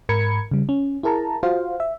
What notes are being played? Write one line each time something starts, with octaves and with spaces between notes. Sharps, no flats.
G#2 A#4 B5 G#6 C#7
C#3 G3
C#4
E4 G#4 A#4 A5 A#5
F4 F#4 C5 F5
E5